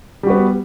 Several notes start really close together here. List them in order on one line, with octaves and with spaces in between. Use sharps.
G3 F#4 B3